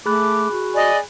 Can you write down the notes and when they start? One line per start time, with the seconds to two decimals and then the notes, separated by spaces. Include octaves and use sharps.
0.06 A3 G#4 B5 D6 F#6
0.52 F#4
0.74 D5 D#5 G#5